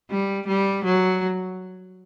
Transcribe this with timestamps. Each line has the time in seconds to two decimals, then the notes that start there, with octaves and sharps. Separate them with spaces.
0.10 G3
0.48 G3
0.85 F#3